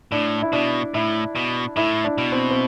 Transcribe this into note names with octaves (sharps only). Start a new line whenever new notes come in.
A2 D4
E4
B2 D4
A2 E4
B2
A2 E4
D4
B2
C4
C4